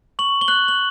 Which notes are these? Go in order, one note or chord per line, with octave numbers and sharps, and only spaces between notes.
C#6 F#7
G7
F#6 F#7
F#7